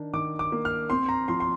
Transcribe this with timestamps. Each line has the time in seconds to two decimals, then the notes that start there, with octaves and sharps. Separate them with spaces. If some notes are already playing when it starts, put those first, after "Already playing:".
Already playing: D#3 D4
0.14 D#3 D6
0.39 D6
0.52 A#3
0.65 F6
0.90 C4 C6
1.09 A#5
1.28 F3 C6
1.40 C6